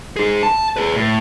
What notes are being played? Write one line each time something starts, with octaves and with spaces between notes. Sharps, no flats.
D#4 G#4
A5
G#4 B4
A2